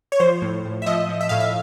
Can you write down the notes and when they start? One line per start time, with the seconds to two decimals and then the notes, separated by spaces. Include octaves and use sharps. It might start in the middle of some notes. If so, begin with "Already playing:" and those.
0.12 C#5
0.20 F3 C5
0.42 A2
0.65 A2
0.82 E5
0.86 F3 D#5
1.09 F3
1.21 E5
1.29 A2 F5
1.40 E5